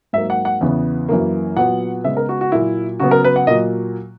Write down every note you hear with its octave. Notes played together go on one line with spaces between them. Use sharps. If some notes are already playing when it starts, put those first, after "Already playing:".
G#2 F#3 A#3 E5
F#5
F#5
E2 C#3 E3 B3
F#2 E3 A#3
A#2 F#3 B3 F#5
C#3 G#3 B3 E5
A#4
F#4
F#4
A#2 F#3 A#3 E4
C#3 F#3 B3 F#4
A#4
B4
F#5
A#2 F#3 A#3 D#5